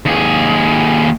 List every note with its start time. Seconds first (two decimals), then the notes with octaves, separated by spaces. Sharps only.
0.06 D#2 G#4